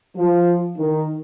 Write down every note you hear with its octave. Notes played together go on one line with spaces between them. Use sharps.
F3
D#3